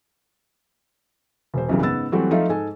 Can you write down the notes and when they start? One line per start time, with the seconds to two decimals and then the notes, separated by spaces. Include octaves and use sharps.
1.54 E1 C5
1.69 B1 F#2 C#3 E3 G3
1.81 G#2 C#3 B3 E6 A6
2.12 E3 F#3 G3 A3 C4 F#4
2.31 F3 A3 D#4 F4 E5 F5
2.49 G#2 A4 G#5